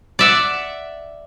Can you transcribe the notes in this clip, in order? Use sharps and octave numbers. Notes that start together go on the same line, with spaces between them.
D5 E5 F#5